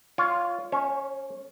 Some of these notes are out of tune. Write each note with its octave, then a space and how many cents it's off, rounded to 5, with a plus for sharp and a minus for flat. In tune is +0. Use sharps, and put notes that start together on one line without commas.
F4 +0 C#5 +20
C#4 +10 C#5 -45